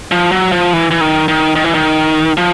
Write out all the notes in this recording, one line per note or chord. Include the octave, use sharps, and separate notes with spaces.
F3
F#3
F3
E3
E3
D#3
D#3
D#3
E3
D#3
F3